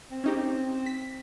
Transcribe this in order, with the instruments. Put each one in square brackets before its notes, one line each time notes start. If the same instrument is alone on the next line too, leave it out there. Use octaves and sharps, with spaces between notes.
[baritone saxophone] C4
[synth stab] C#4 D#4 G4
B6